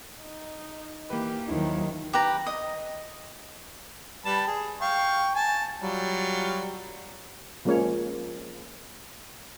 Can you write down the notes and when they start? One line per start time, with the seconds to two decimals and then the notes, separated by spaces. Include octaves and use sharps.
0.21 D#4
1.10 E3 A#3 G4 B4
1.49 D#2 D#3 F3 F#3 E4
2.13 G4 B4 A#5
2.46 D#5
4.25 G3 B4 A5
4.48 G#4
4.81 F5 G5 C#6
5.35 G#5 A5
5.81 F#3 G3 F4
7.65 F3 G#3 A#3 C#4 C#5